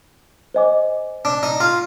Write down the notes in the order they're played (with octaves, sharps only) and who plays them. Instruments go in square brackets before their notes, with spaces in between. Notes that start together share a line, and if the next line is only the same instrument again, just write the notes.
[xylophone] C5 D#5 G#5 D6
[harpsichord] D4
D#4
F4